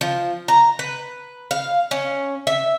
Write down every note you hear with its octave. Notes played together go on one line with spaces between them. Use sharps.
F3
A#5
B4
F5
C#4
E5